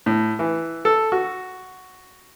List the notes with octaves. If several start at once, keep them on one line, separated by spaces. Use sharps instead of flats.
A2
E3
A4
F#4